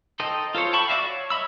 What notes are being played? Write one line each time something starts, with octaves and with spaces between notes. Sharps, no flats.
D#4 A4 C5 D#5 G5
F4 A4 C5 C#5
G5 A5 B5 C#6
F#4 D5 E5 F5
C#5
C#5 D#5 E5 B5 E6